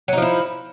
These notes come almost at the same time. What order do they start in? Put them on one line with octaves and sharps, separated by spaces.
F#3 D#4 F3 E4